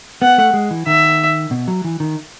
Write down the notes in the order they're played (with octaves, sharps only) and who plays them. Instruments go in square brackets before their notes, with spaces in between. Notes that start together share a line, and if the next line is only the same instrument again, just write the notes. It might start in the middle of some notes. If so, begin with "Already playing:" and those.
[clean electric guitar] B3 [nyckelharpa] F#5
[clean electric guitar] A3
G#3
E3
[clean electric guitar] D#3 [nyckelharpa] E5
[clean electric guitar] B2
F#3
E3
D#3